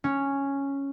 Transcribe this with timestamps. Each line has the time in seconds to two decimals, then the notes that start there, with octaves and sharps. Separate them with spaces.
0.04 C#4